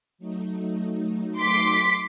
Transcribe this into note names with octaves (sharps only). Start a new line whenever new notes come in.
F#3 A3 D#4
C6 D6 B6